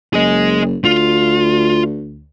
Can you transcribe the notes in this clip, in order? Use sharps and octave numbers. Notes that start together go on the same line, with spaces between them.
F#1 G#4 D#5
D2 F4